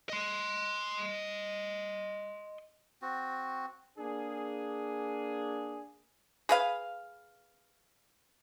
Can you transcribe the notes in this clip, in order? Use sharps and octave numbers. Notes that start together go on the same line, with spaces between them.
D#5 C6
C4 F#4
A#3 D4 G#4
G#4 B4 F5